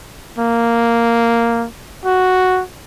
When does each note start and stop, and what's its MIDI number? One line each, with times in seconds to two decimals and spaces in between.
0.38 1.66 58
2.05 2.63 66